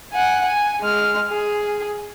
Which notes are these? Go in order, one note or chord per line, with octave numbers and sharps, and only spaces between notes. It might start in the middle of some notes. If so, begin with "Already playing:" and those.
F#5 G#5
G#5
G#3 F6
G#4